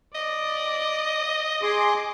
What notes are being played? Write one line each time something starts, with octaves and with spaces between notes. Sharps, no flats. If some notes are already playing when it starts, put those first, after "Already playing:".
D5 D#5
G#4 C6 D6